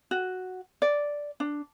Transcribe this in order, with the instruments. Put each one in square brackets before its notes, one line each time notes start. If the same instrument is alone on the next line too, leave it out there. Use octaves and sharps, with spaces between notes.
[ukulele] F#4
D5
D4